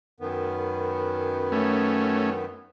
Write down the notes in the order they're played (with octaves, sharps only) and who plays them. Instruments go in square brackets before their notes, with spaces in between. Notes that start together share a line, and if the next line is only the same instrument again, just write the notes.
[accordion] F#2 D#3 B3
[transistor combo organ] A3 C#4